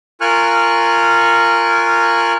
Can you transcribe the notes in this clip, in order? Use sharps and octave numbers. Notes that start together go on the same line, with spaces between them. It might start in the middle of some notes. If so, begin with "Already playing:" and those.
F4 A#4 G#5 C#6 F6 F#6